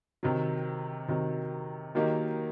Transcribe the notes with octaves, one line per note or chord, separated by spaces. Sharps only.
C3 D#3 F#3
C3 D#3 F#3
D#3 F#3 A#3 D#4 G4